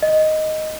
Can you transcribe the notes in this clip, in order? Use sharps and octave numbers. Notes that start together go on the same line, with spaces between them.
D#5